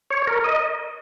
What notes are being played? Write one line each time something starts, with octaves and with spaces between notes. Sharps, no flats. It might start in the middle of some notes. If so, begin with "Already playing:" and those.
C#5
A#4
D#5